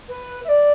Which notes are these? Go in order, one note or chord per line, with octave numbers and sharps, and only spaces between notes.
B4
E5
D5